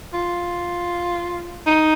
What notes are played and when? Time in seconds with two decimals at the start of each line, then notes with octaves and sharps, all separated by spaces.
0.14 F4
1.67 D#4